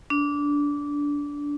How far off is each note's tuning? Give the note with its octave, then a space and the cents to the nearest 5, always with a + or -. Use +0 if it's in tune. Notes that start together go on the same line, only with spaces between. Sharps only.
D4 -20